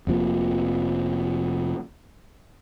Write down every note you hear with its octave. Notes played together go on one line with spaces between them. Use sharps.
F1 C3 F3 A#3